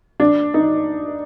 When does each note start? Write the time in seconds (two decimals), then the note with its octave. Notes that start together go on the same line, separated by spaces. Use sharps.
0.20 D4
0.54 D#4